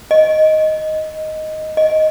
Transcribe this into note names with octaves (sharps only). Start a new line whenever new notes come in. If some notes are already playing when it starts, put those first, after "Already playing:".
D#5
D#5